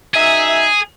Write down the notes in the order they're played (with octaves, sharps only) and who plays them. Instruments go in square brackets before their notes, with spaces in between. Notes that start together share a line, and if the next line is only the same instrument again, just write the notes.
[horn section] F#2 D#4 E5 [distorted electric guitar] G#4